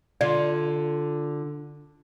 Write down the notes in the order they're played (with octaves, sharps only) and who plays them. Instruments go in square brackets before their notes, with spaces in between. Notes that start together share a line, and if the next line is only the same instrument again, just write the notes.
[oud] D3 F4 [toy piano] D5